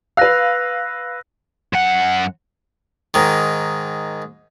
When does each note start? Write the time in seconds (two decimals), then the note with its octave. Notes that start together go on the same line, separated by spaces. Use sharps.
0.17 B4 F5 E6 F#6 A#6
1.73 F#2 F#5
3.14 G#2 D#3